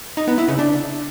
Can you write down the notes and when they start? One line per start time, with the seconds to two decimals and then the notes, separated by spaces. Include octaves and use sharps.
0.17 D#4
0.28 B3
0.38 E4
0.48 C#3
0.59 D4